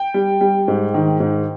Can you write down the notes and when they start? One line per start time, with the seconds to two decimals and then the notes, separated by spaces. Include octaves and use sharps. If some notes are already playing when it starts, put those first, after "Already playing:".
Already playing: G5
0.14 G3
0.41 G3
0.68 G#2
0.94 D#3
1.20 G#2